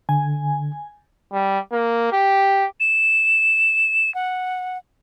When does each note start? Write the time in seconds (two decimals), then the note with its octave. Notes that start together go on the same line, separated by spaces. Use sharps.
0.09 D3 G#5
1.33 G3
1.72 A#3
2.12 G4
2.80 E7
4.15 F#5